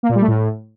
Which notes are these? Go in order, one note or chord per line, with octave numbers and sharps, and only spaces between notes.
A#3
A#2
G3
A3
A2